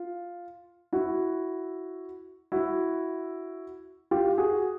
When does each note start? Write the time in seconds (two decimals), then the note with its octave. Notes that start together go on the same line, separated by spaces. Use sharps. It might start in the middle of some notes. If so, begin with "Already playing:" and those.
Already playing: F4
0.93 E4 F#4
2.52 E4 F#4
4.11 F4 G4
4.38 F#4 G#4